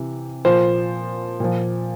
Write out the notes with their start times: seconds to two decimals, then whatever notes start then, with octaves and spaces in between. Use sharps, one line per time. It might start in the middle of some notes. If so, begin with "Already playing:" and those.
Already playing: C3 E3
0.45 A#2 F3 C5
1.40 A#2 F3